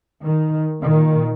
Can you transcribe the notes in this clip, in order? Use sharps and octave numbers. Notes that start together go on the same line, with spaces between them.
D#3
A#2 D#3